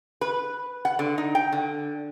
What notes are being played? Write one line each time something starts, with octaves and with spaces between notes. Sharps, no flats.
B4
F#5
D3
D#4
G5
D3